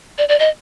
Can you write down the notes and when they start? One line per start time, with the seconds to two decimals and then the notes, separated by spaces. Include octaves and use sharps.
0.18 D5
0.29 D5
0.39 D#5